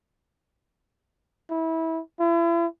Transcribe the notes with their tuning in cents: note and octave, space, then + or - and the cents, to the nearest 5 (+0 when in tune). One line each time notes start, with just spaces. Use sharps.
E4 -25
E4 +40